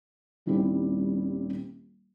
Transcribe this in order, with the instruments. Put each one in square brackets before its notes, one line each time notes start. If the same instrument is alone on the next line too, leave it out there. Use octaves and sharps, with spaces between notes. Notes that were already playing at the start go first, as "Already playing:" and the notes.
[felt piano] D#1 D#3 G3 C4 E4 G4